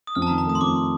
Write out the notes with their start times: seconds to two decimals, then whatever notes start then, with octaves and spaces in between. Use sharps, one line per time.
0.07 D#6
0.15 F2 F6
0.22 A5
0.27 A#5
0.31 D#3
0.38 A#5
0.46 A3 D#6
0.55 C6
0.60 F2 D6